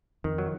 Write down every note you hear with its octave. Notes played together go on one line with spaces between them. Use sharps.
F2 D#3
F#3